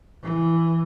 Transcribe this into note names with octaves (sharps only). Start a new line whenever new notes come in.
E3